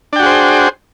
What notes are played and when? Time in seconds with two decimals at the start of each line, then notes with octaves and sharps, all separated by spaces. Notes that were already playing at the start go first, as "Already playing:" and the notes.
0.13 D4
0.16 G5
0.19 F#4
0.23 G#4
0.26 C5